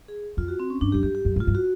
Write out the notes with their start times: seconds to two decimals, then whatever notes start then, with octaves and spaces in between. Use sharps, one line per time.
0.08 G#4
0.37 F2 F4
0.48 F#4
0.60 C4
0.70 C#4
0.81 G2 D4
0.92 F#2 G4
1.03 G2 G4
1.15 G4
1.25 F#2
1.36 G#2
1.40 F4
1.47 G2
1.55 F#4